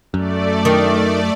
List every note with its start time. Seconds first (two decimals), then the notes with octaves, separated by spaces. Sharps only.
0.14 F#2 A3 D5
0.65 D#3 D4